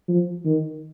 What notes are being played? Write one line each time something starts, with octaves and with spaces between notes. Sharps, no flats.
F3
D#3